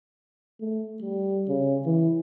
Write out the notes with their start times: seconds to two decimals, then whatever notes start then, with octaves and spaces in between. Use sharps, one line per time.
0.61 A3
1.02 G3
1.48 C#3
1.86 E3